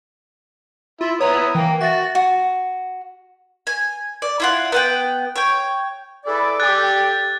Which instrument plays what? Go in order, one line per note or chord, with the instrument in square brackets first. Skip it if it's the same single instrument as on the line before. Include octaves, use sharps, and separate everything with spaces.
[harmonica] E4 [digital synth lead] F4
[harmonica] B3 E4 D#6 [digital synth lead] C#5 [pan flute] A#5
[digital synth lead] E3 [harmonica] A#3 [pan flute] G5
[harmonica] F#4 [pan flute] E5 [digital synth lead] A6
[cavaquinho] F#4
[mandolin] G#5
D5
E4 F4 F#5
B3 F#5 G5
C#5 G5
[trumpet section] E4 G#4 B4 [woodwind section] A4 D5
[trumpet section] G4 [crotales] F#6 A6